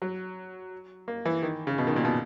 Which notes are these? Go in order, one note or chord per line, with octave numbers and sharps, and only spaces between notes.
F#3
A#3
E3
D#3
C#3
B2
D#3
A#2
B2